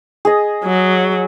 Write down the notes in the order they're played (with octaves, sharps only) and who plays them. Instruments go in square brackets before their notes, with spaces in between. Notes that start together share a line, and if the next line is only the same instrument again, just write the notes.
[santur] G#4 D#5
[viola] F#3